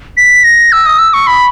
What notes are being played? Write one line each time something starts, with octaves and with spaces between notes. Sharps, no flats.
B6
A#6
E6
D#6
E6
C#6
B5